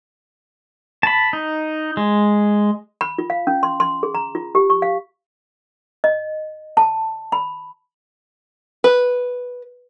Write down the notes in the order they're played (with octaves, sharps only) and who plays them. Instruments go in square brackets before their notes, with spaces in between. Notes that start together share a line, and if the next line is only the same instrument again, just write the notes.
[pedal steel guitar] A5 B5
D#4
G#3
[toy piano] B5
F4
F5
C#4
C6
C6
G#4
A#5
F4
G4
C#6
F5
D#5
A5
B5
[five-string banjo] B4